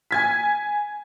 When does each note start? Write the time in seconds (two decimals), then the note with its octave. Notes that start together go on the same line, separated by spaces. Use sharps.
0.11 G#5 G#6 B6